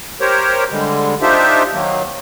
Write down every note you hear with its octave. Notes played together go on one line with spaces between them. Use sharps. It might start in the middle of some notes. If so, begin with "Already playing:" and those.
G4 A#4 C5 C#5
D3 G3 G#3
D4 D#4 F4 G4 C5 E5
D#3 F#3 A#3